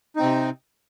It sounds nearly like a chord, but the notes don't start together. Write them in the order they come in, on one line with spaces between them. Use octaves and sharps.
D#4 C4 C3